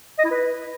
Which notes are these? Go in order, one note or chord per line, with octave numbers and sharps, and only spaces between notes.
D#5
E4
B4